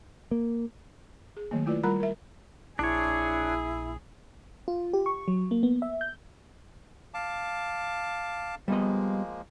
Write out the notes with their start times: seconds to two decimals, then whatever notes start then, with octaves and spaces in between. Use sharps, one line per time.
0.31 A#3
1.37 G#4
1.51 D#3 F#3 A3 A#3
1.66 A3 E4 F4 B4 D5
1.83 G3 F4 A#4 A#5 B5
2.00 A#4 E5
2.79 A#1 D4 E4 G#4 C#5
4.68 F4
4.93 G4
5.06 C#6
5.28 F#3
5.51 A#3
5.63 B3
5.82 E5
6.01 G6
7.14 F5 A5 D6
8.68 F3 G3 G#3 A#3 B3 D#5